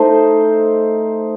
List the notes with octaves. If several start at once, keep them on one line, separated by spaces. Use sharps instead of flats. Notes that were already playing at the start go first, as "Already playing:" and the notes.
Already playing: A3 D#4 C5